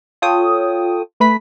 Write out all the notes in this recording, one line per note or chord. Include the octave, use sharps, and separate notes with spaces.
F4 A4 C#5 G5 D#6
A3 B4 B5 B6